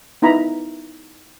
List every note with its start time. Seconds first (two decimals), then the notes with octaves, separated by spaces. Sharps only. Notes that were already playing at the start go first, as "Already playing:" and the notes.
0.22 B3 D#4 E4 A#5 B5